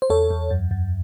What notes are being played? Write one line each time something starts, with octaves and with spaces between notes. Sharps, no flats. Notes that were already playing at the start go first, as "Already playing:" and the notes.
C5
E2 A4 C#5
E2
F#2
F#2